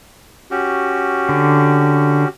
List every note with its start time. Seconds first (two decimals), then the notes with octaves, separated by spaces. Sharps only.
0.51 C#4 F#4 G4
1.29 D3